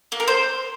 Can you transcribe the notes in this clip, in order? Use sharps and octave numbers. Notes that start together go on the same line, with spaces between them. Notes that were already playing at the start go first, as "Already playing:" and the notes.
A#3
A#4
C5